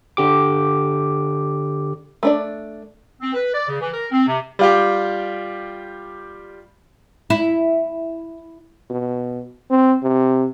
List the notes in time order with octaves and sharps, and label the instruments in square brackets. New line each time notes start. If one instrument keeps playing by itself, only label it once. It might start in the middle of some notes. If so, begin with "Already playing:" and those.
[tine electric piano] D3 G4 D6
[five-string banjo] A3 D4 D5
[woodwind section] C4
B4
D5
C#3
E3
A#4
C4
C3
[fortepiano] G3 F4 G4
[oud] E4
[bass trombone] B2
C4
C3